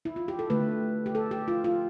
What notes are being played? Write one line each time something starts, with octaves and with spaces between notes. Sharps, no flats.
E4
F4
G4
A4
D3 A3 B4
G4
A4
G4
F4
F4